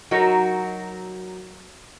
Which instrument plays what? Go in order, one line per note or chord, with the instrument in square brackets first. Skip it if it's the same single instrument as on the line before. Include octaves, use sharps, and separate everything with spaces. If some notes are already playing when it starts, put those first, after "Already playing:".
[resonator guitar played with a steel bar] F#3 D#4 F#4 A#4